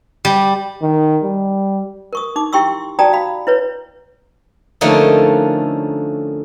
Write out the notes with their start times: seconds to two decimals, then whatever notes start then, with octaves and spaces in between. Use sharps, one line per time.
0.25 G3
0.82 D#3
1.24 G3
2.13 A#4 C#6 D#6
2.36 D#4 D6
2.53 E4 G4 G5 C6 C#6 E6
2.99 F#4 D5 G5 A5 A#5 D#6
3.13 F5 B5
3.47 E4 B4 C#5
4.81 D3 F3 A3 A#3 C#4 D#4